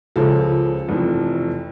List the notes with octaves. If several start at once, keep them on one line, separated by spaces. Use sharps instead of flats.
C#2 C#3 F3 A4
F1 F2 E3